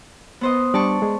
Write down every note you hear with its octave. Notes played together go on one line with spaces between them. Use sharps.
B3 C5 D#5
G3 D4 D5 A5 C#6
G#3 G#4